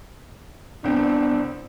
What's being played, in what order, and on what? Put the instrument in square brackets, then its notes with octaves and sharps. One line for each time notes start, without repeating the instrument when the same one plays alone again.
[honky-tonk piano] C2 C4 [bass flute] B3 [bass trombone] D4